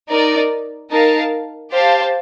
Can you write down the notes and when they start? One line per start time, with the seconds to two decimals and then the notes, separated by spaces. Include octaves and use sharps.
0.09 D#4 A#4 D5
0.91 D#4 A#4 F5 A5
1.73 G4 C5 F5 A5